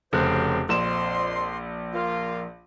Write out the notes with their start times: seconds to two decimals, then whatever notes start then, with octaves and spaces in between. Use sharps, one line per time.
0.13 F1 C#3 F#3 G4 C5 F#6
0.69 A#1 F2 C6 E7
1.94 A#3 F4